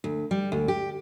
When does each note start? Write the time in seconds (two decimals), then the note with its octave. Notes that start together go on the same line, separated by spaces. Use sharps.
0.04 D2
0.31 G3
0.52 D2
0.68 G4